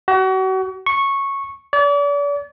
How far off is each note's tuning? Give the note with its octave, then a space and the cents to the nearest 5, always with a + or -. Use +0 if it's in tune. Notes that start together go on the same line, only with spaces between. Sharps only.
F#4 +35
C#6 -10
D5 -40